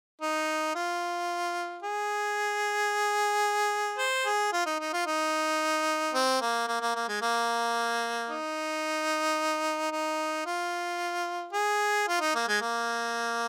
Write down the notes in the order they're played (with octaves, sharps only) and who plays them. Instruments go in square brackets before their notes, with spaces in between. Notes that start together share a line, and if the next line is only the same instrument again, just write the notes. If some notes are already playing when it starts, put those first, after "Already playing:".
[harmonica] D#4
F4
G#4
C5
G#4
F4
D#4
D#4
F4
D#4
C4
A#3
A#3
A#3
A#3
G#3
A#3
D#4
D#4
F4
G#4
F4
D#4
A#3
G#3
A#3